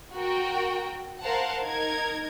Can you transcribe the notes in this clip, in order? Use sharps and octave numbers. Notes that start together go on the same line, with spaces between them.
F#4 A#4 G5
A#4 C5 F5 F#5 A5
D#4 A#4 G#6